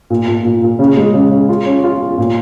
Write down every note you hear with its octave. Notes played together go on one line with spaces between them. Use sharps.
A#2
A#2
A#2
A#2
C#3
G#3
C#3
C#3
F4
C#4
F4
F4
A#2